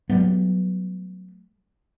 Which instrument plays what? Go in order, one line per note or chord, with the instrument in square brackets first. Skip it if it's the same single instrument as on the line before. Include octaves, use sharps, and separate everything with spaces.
[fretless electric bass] F#3 G3 A3 B3